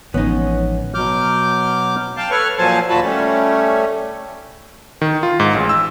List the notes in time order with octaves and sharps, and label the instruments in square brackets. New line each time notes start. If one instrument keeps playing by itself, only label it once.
[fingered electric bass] A1 [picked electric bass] D3 F3 G#3 [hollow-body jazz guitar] B3 D#4 [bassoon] C#4
[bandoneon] B2 F#3 D6 F6 G6
[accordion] F5 G5 A5
A4 B4 C#5 C#6 F6
A#2 F3 F#3 C5 G#5 A5
D#2 A#2 F4 F#4 A5 B5
G3 A3 C#4
[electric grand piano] D#3
F4
G#2
A1
E6